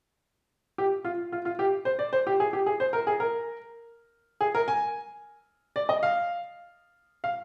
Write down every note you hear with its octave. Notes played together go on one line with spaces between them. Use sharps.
G4
F4
F4
F4
G4
C5
D5
C5
G4
G#4
G4
G#4
C5
A#4
G#4
A#4
G#4
A#4
G#5
D5
D#5
F5
F5